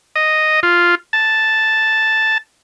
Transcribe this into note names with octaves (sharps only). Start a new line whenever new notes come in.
D#5
F4
A5